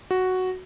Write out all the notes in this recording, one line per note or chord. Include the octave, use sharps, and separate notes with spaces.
F#4